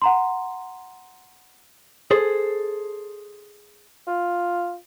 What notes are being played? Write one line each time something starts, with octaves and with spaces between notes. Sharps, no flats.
F#5 A#5 C6
G#4 A4 C5
F4